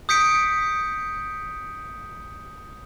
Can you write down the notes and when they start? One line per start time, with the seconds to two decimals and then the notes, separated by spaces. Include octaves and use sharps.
0.09 D#6 G6 B6 C#7 D7